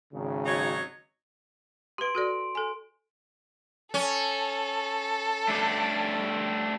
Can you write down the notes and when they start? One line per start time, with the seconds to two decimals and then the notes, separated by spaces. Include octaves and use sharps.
0.12 G#1 C#3
0.45 F#3 D#4 C#5
1.98 G4 B4 C6 D7
2.15 F#4 A4 D5
2.55 A4 G#5
3.94 C#4 A4
5.48 A3 D4 G4